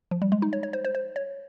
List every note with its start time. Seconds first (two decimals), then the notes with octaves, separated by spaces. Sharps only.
0.11 F3
0.22 G3
0.32 G#3
0.42 D#4
0.53 C#5
0.63 C#5
0.73 C5
0.85 C5
0.95 C5
1.16 C#5